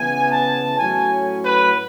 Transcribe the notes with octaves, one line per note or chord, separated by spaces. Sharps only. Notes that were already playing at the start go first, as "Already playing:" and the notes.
Already playing: C#3 E3 B3 G#5
A5
A2 F#3 C#4 G#5
B4